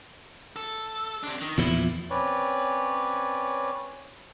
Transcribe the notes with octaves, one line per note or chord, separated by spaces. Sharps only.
A4
C3 D4
D#3
E2 A#2 F3 E4
C4 C#4 B4 C#5 D5